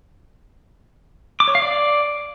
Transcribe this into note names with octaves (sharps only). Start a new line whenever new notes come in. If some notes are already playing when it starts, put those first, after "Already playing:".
D6
C#5
F5
D5